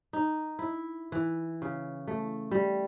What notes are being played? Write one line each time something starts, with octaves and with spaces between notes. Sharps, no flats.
D#4
E4
E3
C#3
A3
G3